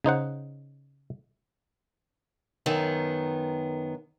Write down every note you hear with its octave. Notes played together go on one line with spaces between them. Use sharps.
C#3 D#4 C5 F#5
F#2 D#3 B3